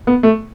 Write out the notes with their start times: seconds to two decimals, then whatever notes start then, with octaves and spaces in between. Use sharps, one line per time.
0.07 B3
0.23 A3